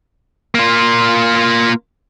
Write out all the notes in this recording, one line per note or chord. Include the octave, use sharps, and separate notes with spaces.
A#3 F4